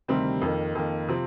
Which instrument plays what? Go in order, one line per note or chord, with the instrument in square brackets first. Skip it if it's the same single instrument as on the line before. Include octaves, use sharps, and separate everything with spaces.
[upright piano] D2 C3 D#3 G3 C4
F2 D#3 A#3
F2 D#3 A#3
C3 F3 C4